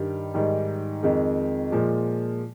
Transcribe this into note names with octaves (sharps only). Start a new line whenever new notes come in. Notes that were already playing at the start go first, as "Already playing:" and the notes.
Already playing: G2 D#3 G3
G#2 D#3 G3
F2 D#3 G#3
A#2 F3 G#3